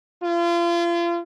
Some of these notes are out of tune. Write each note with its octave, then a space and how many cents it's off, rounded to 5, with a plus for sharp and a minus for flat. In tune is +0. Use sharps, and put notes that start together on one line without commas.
F4 -35